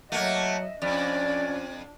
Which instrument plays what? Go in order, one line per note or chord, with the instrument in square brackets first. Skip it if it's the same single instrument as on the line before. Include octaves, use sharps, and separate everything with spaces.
[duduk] F#3 [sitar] A3 A#3 [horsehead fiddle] D#5 E5 [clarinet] F#5
[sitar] F2 [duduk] C#4 [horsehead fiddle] D4 [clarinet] D5